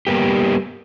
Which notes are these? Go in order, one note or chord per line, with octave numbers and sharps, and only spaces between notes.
G3 A#3 B3 G4